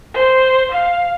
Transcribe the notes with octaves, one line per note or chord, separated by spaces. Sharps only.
C5
F5